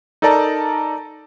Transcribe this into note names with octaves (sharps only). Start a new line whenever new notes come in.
D#4 A4 A#4 D5 A5 A#5